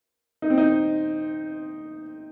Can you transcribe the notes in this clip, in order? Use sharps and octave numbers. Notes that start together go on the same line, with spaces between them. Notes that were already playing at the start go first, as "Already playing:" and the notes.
D#4
C4
D#4